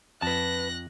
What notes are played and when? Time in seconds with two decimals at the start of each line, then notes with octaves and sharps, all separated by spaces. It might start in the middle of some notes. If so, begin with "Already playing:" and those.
0.22 F2 B4 A5 F#6 A#6